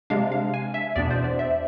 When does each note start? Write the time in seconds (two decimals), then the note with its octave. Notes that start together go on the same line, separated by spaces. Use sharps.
0.10 C3 G#3 D4 F5
0.32 F5
0.54 G#5
0.74 E5
0.96 E2 B2 B3 D4 D5
1.11 C5
1.24 D5
1.39 E5